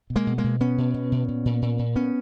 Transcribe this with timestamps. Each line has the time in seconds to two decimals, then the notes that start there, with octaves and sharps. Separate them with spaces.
0.10 B2
0.16 G#3 A#3
0.27 B2
0.38 G#3 A#3
0.44 B2
0.60 B2 B3 C#4
0.78 B2
0.94 B2
1.12 B2
1.28 A#2
1.45 A#2
1.62 A#2
1.79 A#2
1.96 A#2 B3 C#4